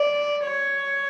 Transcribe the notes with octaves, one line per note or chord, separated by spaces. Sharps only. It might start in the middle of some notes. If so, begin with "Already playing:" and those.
Already playing: D5
C#5